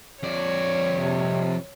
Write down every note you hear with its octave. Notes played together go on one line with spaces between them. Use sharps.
F2 C#5 D5
C3